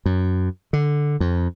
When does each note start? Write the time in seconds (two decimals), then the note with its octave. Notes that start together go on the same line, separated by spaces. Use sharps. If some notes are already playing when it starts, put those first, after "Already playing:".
0.06 F#2
0.73 D3
1.20 F2